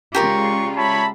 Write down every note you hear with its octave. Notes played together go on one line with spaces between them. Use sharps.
C#3 G#3 F4 G4 A#4 D5 C#6
C#5 E5 A5 B5